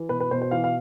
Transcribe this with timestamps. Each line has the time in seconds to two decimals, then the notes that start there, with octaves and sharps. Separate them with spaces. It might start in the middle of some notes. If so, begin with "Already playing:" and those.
Already playing: E3
0.09 B2 B4
0.20 B4
0.31 B2 C5
0.41 C5
0.51 E3 F5
0.64 F5